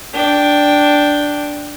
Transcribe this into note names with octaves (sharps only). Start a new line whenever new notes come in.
D4 G5